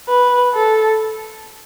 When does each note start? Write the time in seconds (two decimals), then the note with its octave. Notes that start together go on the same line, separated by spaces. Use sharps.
0.09 B4
0.54 A4